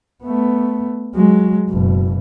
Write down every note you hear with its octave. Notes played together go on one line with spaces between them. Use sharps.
A3 B3
F#3 G#3
F#1 B2